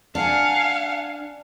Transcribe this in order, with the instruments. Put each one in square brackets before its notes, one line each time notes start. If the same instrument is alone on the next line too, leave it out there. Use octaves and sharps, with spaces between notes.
[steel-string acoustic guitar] D4 [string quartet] F5 F#5 G#5